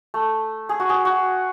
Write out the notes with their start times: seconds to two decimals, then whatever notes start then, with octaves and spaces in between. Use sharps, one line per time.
0.14 A3
0.69 G#4
0.80 F#4
0.89 G#4
1.05 F#4